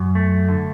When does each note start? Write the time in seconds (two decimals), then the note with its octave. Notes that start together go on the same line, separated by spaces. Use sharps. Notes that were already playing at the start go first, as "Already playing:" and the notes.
Already playing: F#2
0.15 A3
0.48 D3